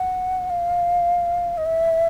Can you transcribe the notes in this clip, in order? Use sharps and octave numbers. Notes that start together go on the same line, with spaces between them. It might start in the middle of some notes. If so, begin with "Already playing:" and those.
Already playing: F#5
F5
D#5
E5